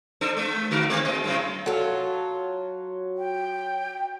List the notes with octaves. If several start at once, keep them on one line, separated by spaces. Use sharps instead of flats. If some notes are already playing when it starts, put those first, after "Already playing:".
D4 A4 C5
G#3
D3 F#4 A#4
G#3 A3 C4
A#2 D#5
F#2 A2 C#3
F#3 F4 F#4 A4
G5